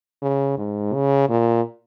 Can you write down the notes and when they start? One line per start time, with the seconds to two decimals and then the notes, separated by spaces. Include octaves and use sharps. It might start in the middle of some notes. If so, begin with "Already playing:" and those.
0.22 C#3
0.58 G#2
0.93 C#3
1.29 A#2